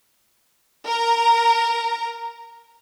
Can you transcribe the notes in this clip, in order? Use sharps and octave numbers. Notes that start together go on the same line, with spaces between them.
A#4 A#5